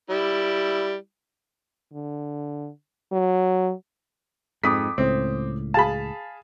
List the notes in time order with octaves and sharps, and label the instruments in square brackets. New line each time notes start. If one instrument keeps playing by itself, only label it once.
[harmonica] G3 E4
[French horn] D3
F#3
[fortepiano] F2 [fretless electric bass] G#2 [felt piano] D6 D#6 B6
[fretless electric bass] C#2 A2 [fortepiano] C4
[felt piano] G#4 F5 [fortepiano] A5 B5